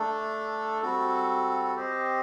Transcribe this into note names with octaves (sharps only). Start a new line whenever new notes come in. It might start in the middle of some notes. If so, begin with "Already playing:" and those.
Already playing: A3 D4 A4
G3 C4 F#4 A4
C4 G4 C5 D#5